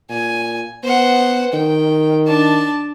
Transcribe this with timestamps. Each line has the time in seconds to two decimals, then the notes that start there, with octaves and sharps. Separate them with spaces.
0.10 A#2 G#5
0.84 B3 C5 F#5
1.53 D#3 G5
2.27 D4 A5